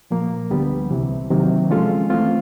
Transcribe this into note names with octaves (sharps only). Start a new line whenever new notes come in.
A#2 F3 A#3
D2 D3 G3 B3
C2 C3 E3
C3 D#3 F#3 A#3
F3 G#3 C#4 F4 A4
E3 A3 C4 F4